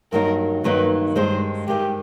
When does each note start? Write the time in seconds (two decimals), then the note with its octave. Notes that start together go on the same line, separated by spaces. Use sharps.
0.12 G2 D#3 F#3 A#3 D#4 A#4
0.64 G2 D#3 F#3 A#3 D#4 B4
1.15 G2 D#3 G#3 C5
1.67 G2 D#3 G#3 G4